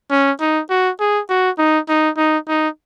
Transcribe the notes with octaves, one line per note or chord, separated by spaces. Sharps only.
C#4
D#4
F#4
G#4
F#4
D#4
D#4
D#4
D#4